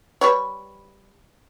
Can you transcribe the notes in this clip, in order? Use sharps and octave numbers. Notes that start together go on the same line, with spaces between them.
G3 B4 C#5